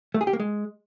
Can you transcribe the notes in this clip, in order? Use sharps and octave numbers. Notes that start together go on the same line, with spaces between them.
A3
G#4
G4
A#3
G#3